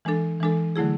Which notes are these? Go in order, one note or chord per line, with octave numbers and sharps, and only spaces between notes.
E3 G#3 D4 A4
E3 G#3 D4 A4
D3 F#3 A3 E4 G#4